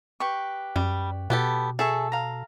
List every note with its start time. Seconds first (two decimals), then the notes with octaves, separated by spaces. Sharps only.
0.20 G4 B4 C#6
0.76 F#2 G3
1.30 B2 B3 G4 A4
1.79 G#4 A4 E5 C#6
2.12 F5 A#5